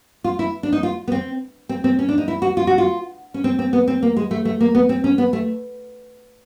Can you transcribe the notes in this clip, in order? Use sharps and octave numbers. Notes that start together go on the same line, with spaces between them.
F4
E4
D4
D#4
F4
B3
C4
C4
C4
C#4
D4
D#4
E4
F#4
F4
F#4
F4
C#4
C4
C4
B3
C4
A#3
G#3
A3
A3
A#3
B3
C4
C#4
B3
A3